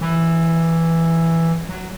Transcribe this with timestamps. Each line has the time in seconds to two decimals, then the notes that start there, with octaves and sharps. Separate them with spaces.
0.01 E3
1.69 F#3